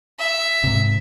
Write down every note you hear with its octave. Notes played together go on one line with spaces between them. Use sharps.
E5
G#2 C3